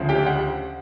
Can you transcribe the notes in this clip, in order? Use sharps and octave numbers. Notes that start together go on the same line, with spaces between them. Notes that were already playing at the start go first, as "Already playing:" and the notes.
Already playing: D2 C#3 F3
G4 G5
F#5